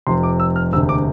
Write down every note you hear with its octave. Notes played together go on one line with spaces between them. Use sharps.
F1 F2 C3 C6
D6
E6
F6
E1 D2 C3 E6
D6